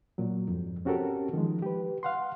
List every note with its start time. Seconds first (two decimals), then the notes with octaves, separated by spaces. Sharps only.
0.18 A#2 F#3
0.48 F2 G#2
0.85 C4 C#4 F#4 G4 A4 A#4
1.33 D#3 F3 G#3
1.62 G4 B4
2.03 F5 F#5 C6